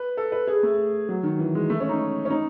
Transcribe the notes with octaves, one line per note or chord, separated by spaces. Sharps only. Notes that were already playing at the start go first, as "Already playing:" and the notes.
Already playing: B4
A4
B4
G#4
A3
F#3
D#3
E3
G#3
A3
C#4
D#4
C#4
D#4